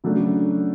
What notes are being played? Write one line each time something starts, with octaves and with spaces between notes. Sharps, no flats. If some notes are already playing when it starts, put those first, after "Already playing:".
C#3 F#3 A3 D4